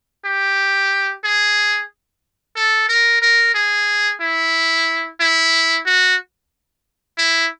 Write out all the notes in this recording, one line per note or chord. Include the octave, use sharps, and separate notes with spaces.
G4
G#4
A4
A#4
A#4
G#4
E4
E4
F#4
E4